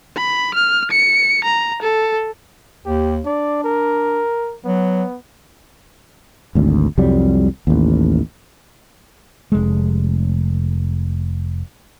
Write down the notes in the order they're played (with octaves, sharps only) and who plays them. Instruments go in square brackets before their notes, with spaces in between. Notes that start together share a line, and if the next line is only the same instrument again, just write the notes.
[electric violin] B5
F6
C#7
A#5
A4
[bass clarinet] D#2 [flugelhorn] G4
[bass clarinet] D4 [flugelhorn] D5
[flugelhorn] A#4
[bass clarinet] F#3 [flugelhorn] B3
[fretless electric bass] G#1 D2
C2 F2 F#3 G3
A1 D#2
F1 G#3